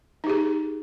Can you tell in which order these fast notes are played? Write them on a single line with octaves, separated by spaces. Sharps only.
D#4 G4 G#4